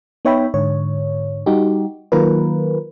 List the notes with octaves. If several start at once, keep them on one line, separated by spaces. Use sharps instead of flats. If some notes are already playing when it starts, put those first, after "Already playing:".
B3 D#4 C#5 E5 G5 B5
G#2 D3 C#5
G3 D#4 F#4 G4
D#3 F#3 A#3 F4 A#4 B4